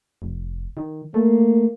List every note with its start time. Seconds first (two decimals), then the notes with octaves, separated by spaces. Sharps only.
0.22 F1
0.77 D#3
1.14 A3 A#3